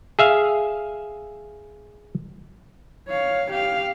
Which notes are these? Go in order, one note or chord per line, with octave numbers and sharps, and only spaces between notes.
G#4 E5 F5
C#5 F5
G4 F5